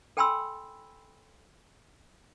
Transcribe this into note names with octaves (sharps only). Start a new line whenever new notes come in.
A4 G5 G#5 B5 C6 E6